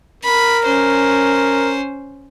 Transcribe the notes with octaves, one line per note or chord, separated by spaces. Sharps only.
A#4 B5
C#4 C5